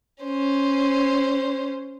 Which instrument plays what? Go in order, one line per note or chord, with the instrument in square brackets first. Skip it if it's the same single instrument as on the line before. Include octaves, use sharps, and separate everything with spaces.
[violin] C#4 C5